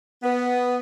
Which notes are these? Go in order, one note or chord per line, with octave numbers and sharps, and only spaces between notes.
B3